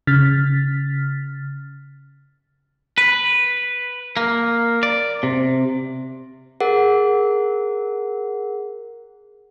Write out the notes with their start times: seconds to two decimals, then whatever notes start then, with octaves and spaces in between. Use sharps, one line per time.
0.07 C#3 F6 A6 B6
2.98 B4
4.17 A#3
4.83 D5
5.23 C3
6.60 G#4 A#4 F#5